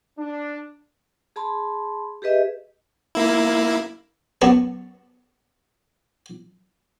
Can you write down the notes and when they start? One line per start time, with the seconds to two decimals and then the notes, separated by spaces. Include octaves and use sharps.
0.19 D4
1.36 G#4 A5 B5 C6
2.22 G4 G#4 B4 D#5 E5
3.15 A#3 E4
4.42 F#2 B3 A5 C#6